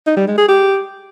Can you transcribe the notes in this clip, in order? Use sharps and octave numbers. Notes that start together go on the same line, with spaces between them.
D#4
G3
G#3
G#4
G4